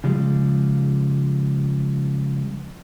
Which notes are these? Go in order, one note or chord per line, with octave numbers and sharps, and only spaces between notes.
C#3 F3 G3 G#3